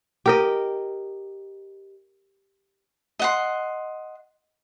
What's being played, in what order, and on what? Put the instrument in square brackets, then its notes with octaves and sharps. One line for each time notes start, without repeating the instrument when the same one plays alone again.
[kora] G4 A#4 D#5
[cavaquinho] D#5 F#5 C6